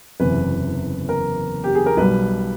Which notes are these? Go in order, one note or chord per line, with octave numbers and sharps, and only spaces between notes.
F#1 E2 C3 B4
A#4
G4
G#4
A#4
B1 B2 G3 B4